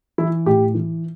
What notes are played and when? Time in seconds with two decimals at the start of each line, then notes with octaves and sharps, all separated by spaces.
0.18 E3 E4
0.46 A2 G4
0.74 E3